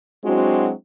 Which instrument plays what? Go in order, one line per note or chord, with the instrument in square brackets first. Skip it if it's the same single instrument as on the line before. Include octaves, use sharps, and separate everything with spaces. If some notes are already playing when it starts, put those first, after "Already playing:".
[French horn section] F#3 G#3 C4 D4 E4 F#4